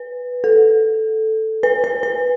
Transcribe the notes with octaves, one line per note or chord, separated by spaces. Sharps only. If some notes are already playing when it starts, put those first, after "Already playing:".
Already playing: B4
A4
B4
B4
B4